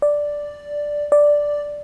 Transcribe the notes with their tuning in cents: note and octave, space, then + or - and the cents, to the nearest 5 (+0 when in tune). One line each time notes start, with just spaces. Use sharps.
D5 +0
D5 +0